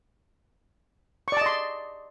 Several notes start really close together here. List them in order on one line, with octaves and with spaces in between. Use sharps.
C#6 D5 A5 D#5 C6